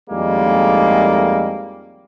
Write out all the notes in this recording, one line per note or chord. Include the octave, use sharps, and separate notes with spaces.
F2 A2 D#3 G3 G#3 A#3